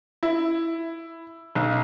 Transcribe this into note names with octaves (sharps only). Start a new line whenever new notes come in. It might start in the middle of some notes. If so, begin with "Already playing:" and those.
E4
B1